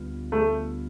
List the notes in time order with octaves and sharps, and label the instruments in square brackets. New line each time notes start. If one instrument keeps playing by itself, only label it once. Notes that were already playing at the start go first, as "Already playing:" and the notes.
Already playing: [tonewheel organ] D2 D3 G3 B3 F4
[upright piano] A3